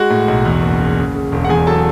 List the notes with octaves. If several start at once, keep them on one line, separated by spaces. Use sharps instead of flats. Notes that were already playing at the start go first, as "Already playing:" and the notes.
Already playing: G#3 F#4 F#5
A2
B1
E2
F#1
C#3
C#3
C#3
E1
F#5
E2 G#4 G#5
F#3 A4 A5